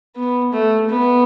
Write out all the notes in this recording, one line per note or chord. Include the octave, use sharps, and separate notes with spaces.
B3
A3
B3